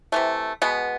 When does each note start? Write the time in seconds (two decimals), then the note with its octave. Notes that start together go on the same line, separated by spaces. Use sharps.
0.12 C3 E3 A3
0.62 B2 G#3 B3